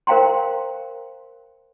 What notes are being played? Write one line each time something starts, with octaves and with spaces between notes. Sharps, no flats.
A#4 C5 F5 G5 A#5 C6